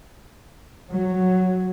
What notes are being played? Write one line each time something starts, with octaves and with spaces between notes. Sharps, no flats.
F#3